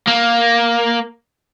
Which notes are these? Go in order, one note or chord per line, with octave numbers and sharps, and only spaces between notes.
A#3